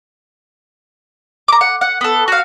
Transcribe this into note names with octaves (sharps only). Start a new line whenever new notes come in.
A#5 D6
F#5
F#5
B3 A4
F#4 F5